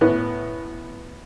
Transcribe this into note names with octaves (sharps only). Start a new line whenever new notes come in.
A2 B3 C#4